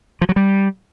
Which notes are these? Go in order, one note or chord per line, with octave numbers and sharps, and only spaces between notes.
F3
F#3
G3